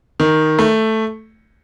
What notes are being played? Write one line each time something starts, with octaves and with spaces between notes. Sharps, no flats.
D#3
A3